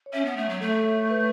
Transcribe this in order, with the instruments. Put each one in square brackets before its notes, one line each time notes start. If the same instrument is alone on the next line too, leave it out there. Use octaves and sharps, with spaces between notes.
[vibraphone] C#5
[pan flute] C#4 [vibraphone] E5
[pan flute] B3
A3
F#3
[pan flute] A3 [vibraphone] A4
[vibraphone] B4